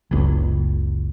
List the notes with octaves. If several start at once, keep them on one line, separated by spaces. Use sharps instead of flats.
F#1 C#2